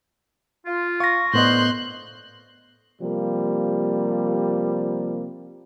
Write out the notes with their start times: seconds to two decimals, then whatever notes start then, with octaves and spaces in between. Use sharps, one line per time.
0.66 F4
1.00 F5 C#6 A#6
1.34 A2 D3 B3 A#4 C5 D#5 C6 F#6
3.02 C3 F3 G3 A#3